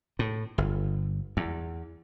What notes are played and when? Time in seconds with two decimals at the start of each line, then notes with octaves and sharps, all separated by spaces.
0.19 A2
0.58 G1
1.37 E2